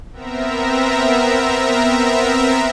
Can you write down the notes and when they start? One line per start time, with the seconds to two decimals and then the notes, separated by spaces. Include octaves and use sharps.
0.12 B3 C4 A#4 E5 A#5